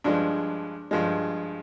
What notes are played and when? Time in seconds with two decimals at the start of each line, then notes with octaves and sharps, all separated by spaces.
0.04 G2 F3 G#3 D4
0.91 G2 F3 G#3